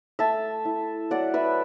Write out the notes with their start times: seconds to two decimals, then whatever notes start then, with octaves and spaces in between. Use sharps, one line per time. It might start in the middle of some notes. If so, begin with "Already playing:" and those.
0.19 A3 E5 A5
0.65 E4
1.10 F#3 D5 F#5
1.34 B4 E5